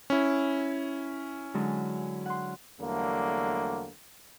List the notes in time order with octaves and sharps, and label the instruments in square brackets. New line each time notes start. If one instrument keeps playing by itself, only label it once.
[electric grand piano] C#4 E4
[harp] D3 F#3 G#3
F#5 C6
[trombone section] E2 D3 F#3 G3 A3 A#3